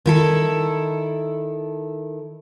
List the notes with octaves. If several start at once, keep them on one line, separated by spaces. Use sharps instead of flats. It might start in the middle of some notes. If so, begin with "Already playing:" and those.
D#3 E4 A4